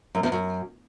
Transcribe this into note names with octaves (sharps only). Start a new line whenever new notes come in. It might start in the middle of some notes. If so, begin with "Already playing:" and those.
F#2
E2
F#2